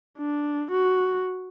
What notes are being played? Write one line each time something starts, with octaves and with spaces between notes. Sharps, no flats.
D4
F#4